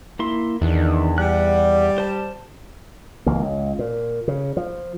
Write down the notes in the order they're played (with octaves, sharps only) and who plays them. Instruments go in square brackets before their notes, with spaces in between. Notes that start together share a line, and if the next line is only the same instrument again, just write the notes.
[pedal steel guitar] A#3 E4 C6
[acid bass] E2 [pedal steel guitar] D#3 D4
[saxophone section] G3 [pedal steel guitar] F#5 F#6
[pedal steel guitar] C5 A5
[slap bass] C#2 E3 A#3
C#2
A#2
C#3
F3